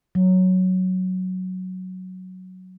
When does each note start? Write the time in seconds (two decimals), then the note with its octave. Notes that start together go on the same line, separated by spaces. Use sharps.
0.15 F#3